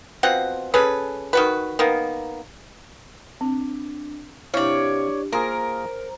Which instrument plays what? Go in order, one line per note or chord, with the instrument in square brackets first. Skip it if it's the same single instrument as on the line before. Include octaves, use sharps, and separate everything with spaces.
[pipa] B2 C4 F4 F#5
C#4 G#4 A4 B4
D#3 F#4 B4
D#3 A#3 B3
[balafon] C4 [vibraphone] D4
[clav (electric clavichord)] C3 F5 [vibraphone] D4 G4 [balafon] E4 [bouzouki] C#5 D5
[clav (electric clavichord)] A#3 F4 G#4 [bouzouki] A#4 [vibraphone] C5 A#5